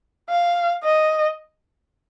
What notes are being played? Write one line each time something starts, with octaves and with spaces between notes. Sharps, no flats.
F5
D#5